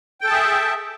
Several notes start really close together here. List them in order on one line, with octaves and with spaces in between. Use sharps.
G5 A4 A5 G#4 E5